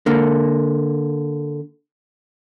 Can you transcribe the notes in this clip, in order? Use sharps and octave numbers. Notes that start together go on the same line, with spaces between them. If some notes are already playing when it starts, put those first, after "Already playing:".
D3 A#3